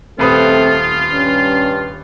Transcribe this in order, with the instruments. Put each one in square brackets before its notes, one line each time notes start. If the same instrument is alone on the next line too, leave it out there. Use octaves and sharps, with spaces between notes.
[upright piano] D#1 B4 D#6 [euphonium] A3 [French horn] C4 [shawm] F4
[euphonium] G2 [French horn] C#4